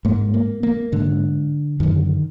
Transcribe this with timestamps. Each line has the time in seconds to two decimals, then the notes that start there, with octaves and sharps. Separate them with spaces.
0.05 G#2 A#3
0.34 A#3
0.63 A#3
0.92 G#2 D3
1.80 F#2 D3 D#3